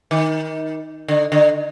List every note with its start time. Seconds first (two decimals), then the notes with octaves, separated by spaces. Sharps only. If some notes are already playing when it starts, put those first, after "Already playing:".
0.11 D#3
1.08 D3
1.32 D3